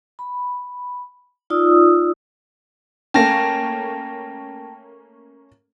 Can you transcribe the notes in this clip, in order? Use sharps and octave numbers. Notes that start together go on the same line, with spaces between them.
B5
D#4 F4 D5 D#6 E6
A3 A#3 C#4 G5 A5 A#6